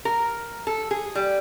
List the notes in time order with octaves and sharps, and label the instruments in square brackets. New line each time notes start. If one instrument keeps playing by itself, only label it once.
[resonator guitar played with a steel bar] A#4
A4
G#4
G3